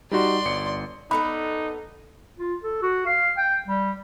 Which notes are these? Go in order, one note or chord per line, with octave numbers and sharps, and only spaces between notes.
G3 D#4 F#4 D5 C6
G1 C#7
B3 D#4 A4 D5 B5
F4
A4
F#4
F5
G5
G3